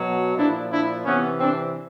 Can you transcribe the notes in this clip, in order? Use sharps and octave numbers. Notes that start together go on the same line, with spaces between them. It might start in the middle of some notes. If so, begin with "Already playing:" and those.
Already playing: B2 F#3
A#2 F3 D4 E4
D4 E4
C3 E3 B3 C#4
C4 D4